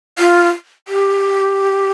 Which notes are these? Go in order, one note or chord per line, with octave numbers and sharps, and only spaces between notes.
F4
G4